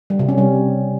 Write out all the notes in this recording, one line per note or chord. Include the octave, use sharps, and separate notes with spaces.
G3
C3
C#4
G3